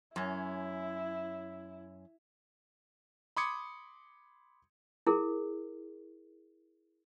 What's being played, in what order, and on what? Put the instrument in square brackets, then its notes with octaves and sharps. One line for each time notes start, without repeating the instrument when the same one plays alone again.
[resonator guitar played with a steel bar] F#2 C#4 [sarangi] E4
[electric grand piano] B5 C6 D6 D#6 G#6 C#7
[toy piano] E4 G#4 A#4